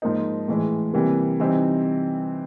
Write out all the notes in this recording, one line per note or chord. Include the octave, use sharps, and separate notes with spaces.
G#2 F3 A#3 D#4
A2 E3 G#3
C3 E3 G3 A#3
C3 E3 G3 C4 D#4